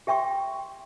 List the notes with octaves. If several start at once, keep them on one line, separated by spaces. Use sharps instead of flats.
G4 E5 G5 C6 C#6